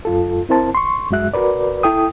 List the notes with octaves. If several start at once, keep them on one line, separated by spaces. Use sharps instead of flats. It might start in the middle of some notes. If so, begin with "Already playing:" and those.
F#2 F4 A4
C4 E4 A#4 C5 A5
C6 C#6
F#2 G#3 F#4 E5 F#6
F#4 A#4 B4 D5
E4 A4 G5 D#6